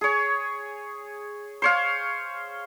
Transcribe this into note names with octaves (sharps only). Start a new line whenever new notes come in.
G#4 C#5
C5 C#5 F5